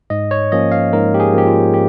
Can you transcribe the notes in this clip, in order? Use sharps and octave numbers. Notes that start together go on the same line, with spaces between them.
G#2 D#5
C#5
F3 A#3 C#4 D#5
F5
G#2 A#4
G4
G#4
F3 A#3 C#4 G4
F4
G4